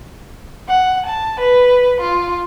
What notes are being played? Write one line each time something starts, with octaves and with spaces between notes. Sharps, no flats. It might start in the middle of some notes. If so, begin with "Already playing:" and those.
F#5
A5
B4
F4